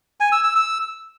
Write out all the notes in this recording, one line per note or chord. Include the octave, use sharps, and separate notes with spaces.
G#5
E6
E6
E6